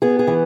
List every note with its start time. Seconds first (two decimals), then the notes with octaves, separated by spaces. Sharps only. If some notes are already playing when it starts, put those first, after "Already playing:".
0.02 B3 G#4
0.19 G#4
0.27 E3